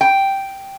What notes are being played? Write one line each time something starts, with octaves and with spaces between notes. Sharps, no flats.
G5